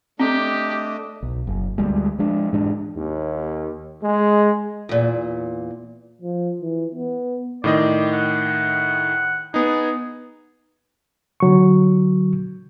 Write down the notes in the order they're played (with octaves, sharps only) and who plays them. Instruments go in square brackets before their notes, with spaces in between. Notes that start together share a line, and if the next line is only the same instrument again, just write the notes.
[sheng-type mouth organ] A3 D4 D#5 [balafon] C4 [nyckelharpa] G4
[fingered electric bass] B1
F#1
D2 G3 G#3
F3 G#3 D4
G#2 E3 G#3 D4
[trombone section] D#2
G#3
[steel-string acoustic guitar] E2 A#2
[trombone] F3
E3
B3
[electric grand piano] A2 D#3 D#5 [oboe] D5
[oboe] F#5
[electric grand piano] B3 D#4 [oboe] G#4
[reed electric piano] D3 F#3 C#6